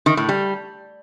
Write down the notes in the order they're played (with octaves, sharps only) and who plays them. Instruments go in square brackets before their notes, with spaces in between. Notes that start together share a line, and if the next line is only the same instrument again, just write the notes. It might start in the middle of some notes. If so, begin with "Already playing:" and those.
[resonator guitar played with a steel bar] D#3
A2
G3